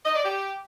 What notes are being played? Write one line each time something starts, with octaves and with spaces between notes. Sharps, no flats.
D#5
D5
G4